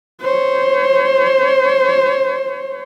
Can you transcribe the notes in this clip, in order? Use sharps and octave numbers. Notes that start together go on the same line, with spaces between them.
C5 C#5